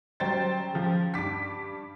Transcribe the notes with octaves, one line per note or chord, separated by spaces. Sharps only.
F#3 G3 C#4 C5 G5 A6
C#3 F3 G4
G2 D6 B6